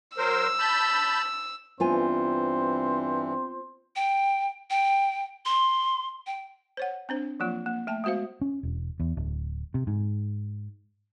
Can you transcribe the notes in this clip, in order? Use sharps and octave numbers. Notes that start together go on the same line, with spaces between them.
F#3 A#4 C5 E6
A5 B5 G6
G2 E3 B3 C4 F4 C5 G#5
G5
G5
C6
G5
C5 C#5 F#5
C4 D4 C5
F3 F#3 A#3 F4
A#3
A3 G5 A5
G#3 B3 F#4 C5 F5
C#4
E1
E2
D1
C3
G#2